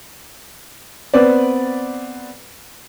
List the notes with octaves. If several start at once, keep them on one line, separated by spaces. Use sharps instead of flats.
B3 C4 B4 D5